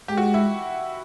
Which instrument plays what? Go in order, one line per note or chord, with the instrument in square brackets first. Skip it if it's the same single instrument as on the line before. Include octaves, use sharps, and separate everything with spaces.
[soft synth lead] G#3 [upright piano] G4
[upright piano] F#4
E4